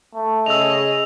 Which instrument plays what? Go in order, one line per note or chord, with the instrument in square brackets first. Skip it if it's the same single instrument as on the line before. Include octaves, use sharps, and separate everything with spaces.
[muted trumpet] A3
[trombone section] C#3 G#4 [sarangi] D#5 [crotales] E6 F7